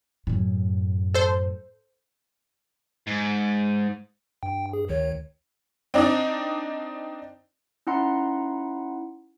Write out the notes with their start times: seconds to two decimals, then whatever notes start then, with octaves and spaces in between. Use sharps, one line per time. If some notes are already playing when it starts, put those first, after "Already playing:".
0.27 F#2 A2
1.14 A4 C5
3.07 G#2
4.43 G2 G5
4.73 G#4
4.89 D2 D#3 C#5
5.94 C4 D4 D#4 D5 D#5
7.87 C#4 D#4 E4 F#5 A#5 C6